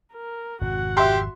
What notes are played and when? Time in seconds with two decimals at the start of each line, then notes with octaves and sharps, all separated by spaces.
0.13 A#4
0.62 G#1 F2 C3 F#4 F#5
0.97 G4 E5 C6